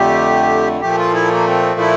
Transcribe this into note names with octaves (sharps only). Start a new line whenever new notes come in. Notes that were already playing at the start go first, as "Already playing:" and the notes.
Already playing: F2 D3 A3 G4
A#2 F3 A3 G4
F4
E4
A#3
C4
E4